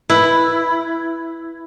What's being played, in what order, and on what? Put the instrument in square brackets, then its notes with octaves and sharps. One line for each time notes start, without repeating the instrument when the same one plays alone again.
[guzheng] E4 [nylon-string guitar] B4